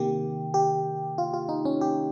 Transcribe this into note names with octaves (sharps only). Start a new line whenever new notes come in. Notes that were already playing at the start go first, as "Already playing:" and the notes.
Already playing: C3 D#3 A#3 G4
G4
F4
F4
D#4
C#4
G4